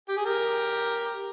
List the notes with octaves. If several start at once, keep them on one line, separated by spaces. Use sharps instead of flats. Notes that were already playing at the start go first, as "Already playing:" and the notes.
G4
G#4
G4 A#4